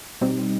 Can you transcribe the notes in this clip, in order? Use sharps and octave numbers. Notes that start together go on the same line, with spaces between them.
B2 G3 C4 D#4